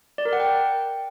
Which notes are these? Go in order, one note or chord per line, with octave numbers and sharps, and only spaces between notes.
D5
A#4
F#5
G5